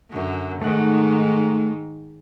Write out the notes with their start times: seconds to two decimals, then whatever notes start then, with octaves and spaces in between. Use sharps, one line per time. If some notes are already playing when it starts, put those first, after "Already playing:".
0.11 F#2 D3
0.62 G#2 D#3 A3 F#5